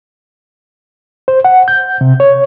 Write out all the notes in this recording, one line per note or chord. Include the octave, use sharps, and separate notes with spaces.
C5
F#5
G6
C3
C#5